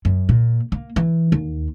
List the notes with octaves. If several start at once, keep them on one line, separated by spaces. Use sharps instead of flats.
F#2
A#2
A#3
E3
D#2